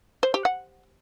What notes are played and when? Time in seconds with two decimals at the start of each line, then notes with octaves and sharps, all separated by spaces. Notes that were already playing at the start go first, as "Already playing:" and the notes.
0.23 C5
0.34 G4
0.45 F#5